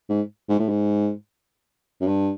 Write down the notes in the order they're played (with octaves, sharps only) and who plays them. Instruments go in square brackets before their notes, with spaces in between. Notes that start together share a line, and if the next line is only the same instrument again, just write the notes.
[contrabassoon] G#2
G#2
A2
G#2
F#2
G2